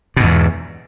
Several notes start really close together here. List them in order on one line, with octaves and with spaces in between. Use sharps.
B2 G#2 E2